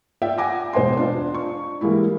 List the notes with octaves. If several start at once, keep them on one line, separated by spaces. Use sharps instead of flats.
F4 D5 E5 G5
F#5 G#5 D6 A#6
E1 C5 D#5 G#5 C6
D4 F4
C#6
E3 G3 G#3 A#3 E4